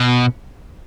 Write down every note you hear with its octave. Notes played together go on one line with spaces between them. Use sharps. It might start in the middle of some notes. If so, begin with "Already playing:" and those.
Already playing: B2